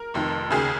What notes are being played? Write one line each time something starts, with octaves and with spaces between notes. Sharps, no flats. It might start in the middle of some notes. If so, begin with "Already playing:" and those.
Already playing: A#4
F1 F2 D#3
D#2 C#3 G#4